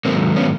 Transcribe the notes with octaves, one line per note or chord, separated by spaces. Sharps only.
G#2 D#3 F#3 A#3 C4
B3 C#4